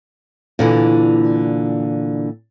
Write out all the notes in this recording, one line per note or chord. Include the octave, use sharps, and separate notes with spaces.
A#2 D3 E3